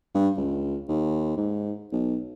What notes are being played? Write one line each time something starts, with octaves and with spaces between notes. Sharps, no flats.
G2
C#2
D#2
G#2
B1